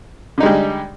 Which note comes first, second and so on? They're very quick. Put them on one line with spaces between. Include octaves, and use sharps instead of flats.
D3 D#4 G#3 G3